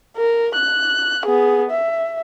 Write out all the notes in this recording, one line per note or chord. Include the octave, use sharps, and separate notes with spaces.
A#4
F#6
B3 G#4
E5